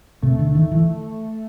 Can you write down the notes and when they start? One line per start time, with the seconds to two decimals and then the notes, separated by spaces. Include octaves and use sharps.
0.22 C3 A3
0.39 D3
0.55 D#3
0.72 E3